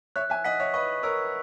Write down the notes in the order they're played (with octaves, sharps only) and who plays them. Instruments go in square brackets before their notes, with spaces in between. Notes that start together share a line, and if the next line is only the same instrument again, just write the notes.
[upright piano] C#5 E5 [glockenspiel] F#6
[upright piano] E5 G#5
[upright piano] D#5 F#5 [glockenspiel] B6
[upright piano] C#5 E5
[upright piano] B4 D#5 [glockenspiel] C#6
[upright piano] A#4 C#5 [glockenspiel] E6